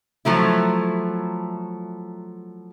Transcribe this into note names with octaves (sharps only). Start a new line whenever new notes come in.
F3 F#3 A3 E4